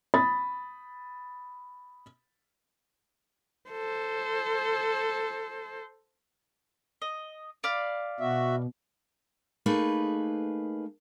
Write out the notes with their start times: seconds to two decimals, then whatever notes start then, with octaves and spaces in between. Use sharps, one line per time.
0.14 B5 D#6 A6
3.70 A4 C5
7.02 D#5
7.64 D5 F5 B5
8.20 B2 F#4 E5
9.66 A3 A#3 D#4 G#4 B4